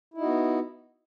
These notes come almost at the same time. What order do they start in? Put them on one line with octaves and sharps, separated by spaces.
E4 D#4 F#4 B3